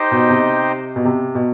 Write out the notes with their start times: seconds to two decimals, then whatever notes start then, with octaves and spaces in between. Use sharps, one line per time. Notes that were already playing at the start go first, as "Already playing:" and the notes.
Already playing: D#4 G4 C5 D#5 G5
0.11 B2
0.30 C3
0.96 B2
1.05 C3
1.35 B2